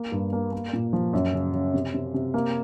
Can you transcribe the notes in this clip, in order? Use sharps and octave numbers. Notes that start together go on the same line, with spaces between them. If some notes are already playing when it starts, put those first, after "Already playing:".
Already playing: A#3
G2
A#3
A#3
A#2
F3
F#2
C#3
C#3
C3
C3
C3
A#3